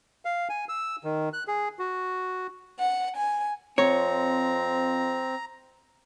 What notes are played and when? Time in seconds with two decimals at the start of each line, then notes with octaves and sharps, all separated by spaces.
0.25 F5
0.49 G#5
0.69 E6
1.04 D#3
1.33 F#6
1.48 G#4
1.79 F#4
2.79 F#5
3.16 G#5
3.78 F2 C4 C#5 A#5